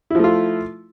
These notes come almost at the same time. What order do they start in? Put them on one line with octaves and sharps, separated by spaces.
E4 F3 A3 F4